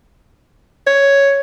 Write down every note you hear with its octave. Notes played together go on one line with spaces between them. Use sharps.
C#5